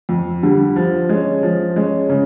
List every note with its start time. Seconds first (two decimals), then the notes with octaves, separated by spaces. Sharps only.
0.09 F2
0.43 D3 G3
0.76 F3
1.09 G#3 C#4
1.43 F3
1.76 G#3 C#4
2.09 C#3